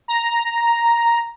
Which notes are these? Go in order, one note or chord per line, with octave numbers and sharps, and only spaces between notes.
A#5